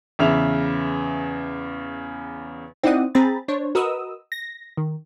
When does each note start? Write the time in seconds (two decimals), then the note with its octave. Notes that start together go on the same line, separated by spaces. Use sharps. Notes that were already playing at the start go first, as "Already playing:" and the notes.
0.19 E2 C#3 E5 F7
2.83 C4 D#4 E4 D5 F#5 D#6
3.15 C4 G#4 A#5 B5 A6
3.48 D4 C5 C#5
3.75 F#4 A#4 B4 D#5 D#6 E6
4.32 A#6
4.77 D#3